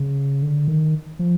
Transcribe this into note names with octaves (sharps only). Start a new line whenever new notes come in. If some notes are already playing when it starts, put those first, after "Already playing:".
Already playing: C#3
D3
D#3
F3